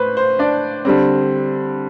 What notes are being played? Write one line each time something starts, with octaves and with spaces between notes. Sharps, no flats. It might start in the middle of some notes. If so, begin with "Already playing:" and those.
Already playing: A2 B4 C5
C5
D4 D5
D3 G3 C4